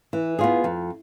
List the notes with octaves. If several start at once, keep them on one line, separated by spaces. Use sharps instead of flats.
E3
B3 F4 G#4
F2